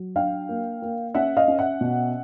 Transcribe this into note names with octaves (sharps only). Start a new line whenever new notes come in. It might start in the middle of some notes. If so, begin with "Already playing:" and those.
Already playing: F#3
D4 F5 G5
A#3
A#3
C#4 E5 F#5
D#5 F5
C#4
E5 F#5
B2